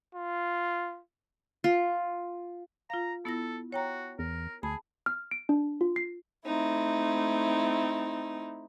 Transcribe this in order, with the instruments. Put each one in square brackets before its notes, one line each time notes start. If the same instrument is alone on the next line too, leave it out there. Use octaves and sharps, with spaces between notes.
[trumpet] F4
[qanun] F4
[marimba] F4 F5 [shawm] A#5
[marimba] B3 E4 A#6 [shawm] A4
[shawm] F#4 [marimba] C#5 G5 A#5
[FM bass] E2 [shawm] A#4
[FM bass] D2 [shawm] G#4 [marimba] A5 B5
[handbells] F6
D7
D4
F4
C7
[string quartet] A3 C4 D#4 E4